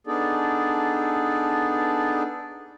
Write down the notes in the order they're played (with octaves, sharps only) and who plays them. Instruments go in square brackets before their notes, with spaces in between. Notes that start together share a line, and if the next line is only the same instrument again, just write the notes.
[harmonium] B3 D4 D#4 G#4 A4 D5